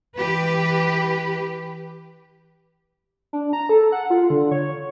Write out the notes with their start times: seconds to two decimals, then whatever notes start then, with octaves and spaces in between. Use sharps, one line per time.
0.17 E3 G4 B4
3.33 D4
3.53 A#5
3.69 A4
3.92 F#5
4.10 F4
4.30 D3
4.51 C#5